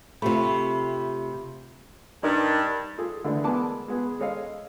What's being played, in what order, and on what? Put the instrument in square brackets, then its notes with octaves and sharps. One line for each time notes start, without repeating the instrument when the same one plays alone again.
[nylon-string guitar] C3 A3 [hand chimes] F4 G4 B5
[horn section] G2 [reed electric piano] D4 D#4 A#4
[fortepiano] F4 G#4 A4
D3 E3 G#3 A3 D4 E4
G#3 B3 A#4 G#5 A5 D6
G#3 B3 G#4
G#3 A4 C#5 D#5 F5